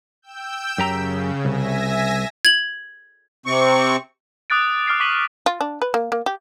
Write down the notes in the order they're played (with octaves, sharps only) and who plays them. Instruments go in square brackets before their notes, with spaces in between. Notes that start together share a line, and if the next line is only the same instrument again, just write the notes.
[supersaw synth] G5 E6 G6
[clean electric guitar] F#2 G4 A#5 [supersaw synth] C#3
[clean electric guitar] C2 [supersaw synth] E5 G#5 A#6
[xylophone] G#6 F#7
[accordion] C3 C4 C#6
[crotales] D6 D#6 F#6 A6 D7
D6 F6 A6 C7 D7
C#6 D6 B6 D#7 F#7
[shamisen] F4
D4
B4
A#3
A#3
G4